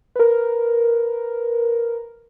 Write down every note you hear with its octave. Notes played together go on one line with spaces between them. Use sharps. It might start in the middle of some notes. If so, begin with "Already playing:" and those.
A#4 B4